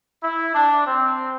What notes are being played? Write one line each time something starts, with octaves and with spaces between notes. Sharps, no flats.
E4
D4
C4